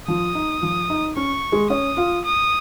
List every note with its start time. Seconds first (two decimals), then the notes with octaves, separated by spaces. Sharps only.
0.08 F3 F4 D#6
0.35 D#4
0.62 F3 F4
0.90 D#4
1.16 C#4 C#6
1.52 G#3 G#4
1.70 C#4 C#5 D#6
1.97 F4 F5
2.25 D#6